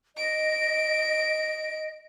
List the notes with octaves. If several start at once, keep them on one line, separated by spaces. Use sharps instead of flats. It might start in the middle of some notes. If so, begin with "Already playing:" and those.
D#5 D7